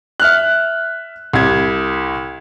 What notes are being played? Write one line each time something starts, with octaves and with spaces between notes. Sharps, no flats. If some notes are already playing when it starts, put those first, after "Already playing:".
E5 F6 F#6
C2 G#6